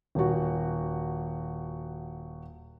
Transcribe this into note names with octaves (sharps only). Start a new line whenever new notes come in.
D#1 F#4